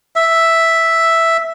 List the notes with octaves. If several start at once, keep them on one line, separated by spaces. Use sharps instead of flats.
E5